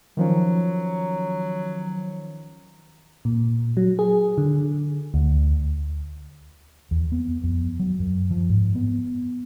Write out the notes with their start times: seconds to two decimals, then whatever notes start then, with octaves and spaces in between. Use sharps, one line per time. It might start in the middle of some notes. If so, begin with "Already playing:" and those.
0.17 D#3 F3 F#3 C#4
3.25 A#2
3.77 F#3
3.99 G#4
4.38 D3
5.14 D2
6.91 E2
7.12 B3
7.43 F2
7.80 F#3
7.99 F#2
8.31 F3
8.49 G#2
8.75 B3